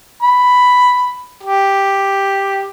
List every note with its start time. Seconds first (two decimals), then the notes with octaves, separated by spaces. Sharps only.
0.23 B5
1.44 G4